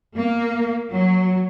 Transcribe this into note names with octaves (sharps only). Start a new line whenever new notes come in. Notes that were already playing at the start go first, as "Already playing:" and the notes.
A#3
F#3